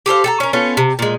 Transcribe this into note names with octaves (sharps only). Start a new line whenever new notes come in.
G4 A4 C5 F5
A4 G5 A#5
C#4 A#4
B3 C#4 F4 A4
C3
A#2 G#3